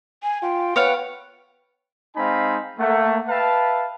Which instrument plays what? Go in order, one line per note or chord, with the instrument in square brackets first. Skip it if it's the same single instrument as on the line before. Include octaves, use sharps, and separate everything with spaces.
[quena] G#5
[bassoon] F4 [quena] G5
[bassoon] B3 [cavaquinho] C#5 F5 F#5
[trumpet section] G#3 C4 D#4 F5 G#5 B5
A3 A#3 F#5
B4 E5 F5 G5 A5